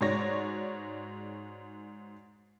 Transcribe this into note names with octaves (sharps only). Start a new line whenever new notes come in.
G#2 G#3 F#4 C#5 D5 A#6